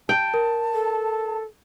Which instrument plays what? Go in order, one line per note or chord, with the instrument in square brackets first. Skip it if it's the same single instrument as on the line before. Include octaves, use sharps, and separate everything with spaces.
[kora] G5 [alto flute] A5
[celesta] A#4
[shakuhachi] A4